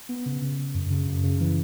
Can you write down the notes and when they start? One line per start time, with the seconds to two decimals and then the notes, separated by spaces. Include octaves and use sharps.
0.09 B3
0.26 C#3
0.42 C#3
0.58 C#3
0.75 F#2
0.90 C#3
1.07 F#2
1.24 C#3
1.40 E3